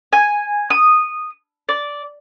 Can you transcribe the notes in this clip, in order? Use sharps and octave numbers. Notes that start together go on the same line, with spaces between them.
G#5
D#6
D5